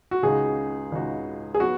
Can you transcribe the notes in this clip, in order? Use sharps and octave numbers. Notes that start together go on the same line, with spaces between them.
F#4
C#2 C#3 G#3 D#4 F#4 G#4
C#2 C#3 G#3 D#4 F#4
G#4
F#3 B3 F#4